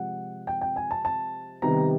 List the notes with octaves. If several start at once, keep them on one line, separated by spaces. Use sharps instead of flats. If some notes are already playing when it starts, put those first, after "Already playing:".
Already playing: C3 F3 G#3 C4 F#5
G5
G5
G#5
A5
A5
C3 D#3 G3 B3 A#5